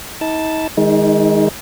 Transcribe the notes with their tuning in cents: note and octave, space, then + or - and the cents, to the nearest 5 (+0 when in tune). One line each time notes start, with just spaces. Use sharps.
D#4 +40 A5 +0
D#3 +0 G#3 -15 D#4 +35